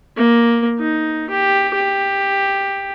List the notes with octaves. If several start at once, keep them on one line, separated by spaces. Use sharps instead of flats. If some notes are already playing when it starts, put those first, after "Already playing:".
A#3
D#4
G4
G4